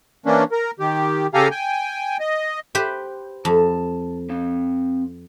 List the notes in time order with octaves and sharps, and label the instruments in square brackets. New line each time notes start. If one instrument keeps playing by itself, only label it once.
[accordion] E3 A#3 C#4 D4
A#4
D#3 G4
C#3 G4 A4 F5 G#5 A#5
G5 G#5
D#5
[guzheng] G4 B4 C5
[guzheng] F2 [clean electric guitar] A5
[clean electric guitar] C4 F5